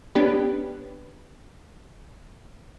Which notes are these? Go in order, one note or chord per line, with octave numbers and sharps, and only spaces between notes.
B3 C#4 D4 G4 B4